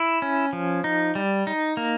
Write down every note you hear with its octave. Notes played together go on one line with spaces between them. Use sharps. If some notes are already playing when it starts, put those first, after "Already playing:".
Already playing: E4
C#4
F3
D#4
G3
D#4
A#3